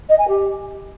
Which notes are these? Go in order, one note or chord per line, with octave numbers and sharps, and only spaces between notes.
D#5
G#5
G4